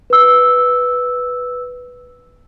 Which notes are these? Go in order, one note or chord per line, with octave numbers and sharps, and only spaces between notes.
B4 E6